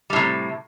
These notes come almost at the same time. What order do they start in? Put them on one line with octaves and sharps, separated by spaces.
G3 A2 C3